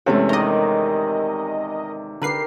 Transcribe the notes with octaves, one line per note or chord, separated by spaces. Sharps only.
E2 C3 G#3 A3 C#4 C#5
D#3 A#4 D5 D#5
D3 G4 A#4 B4 C7